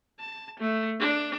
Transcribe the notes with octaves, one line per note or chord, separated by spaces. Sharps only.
A5
A3
D4